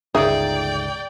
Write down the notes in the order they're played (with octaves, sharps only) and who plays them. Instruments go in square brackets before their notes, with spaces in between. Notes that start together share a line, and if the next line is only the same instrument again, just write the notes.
[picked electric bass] G1 C#2 [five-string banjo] D#4 G#4 E5 [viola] D5 G5